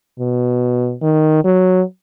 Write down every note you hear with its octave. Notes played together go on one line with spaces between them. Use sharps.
B2
D#3
F#3